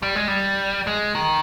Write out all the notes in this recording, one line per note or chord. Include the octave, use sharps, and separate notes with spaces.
G3
G#3
G3
G#3
D#3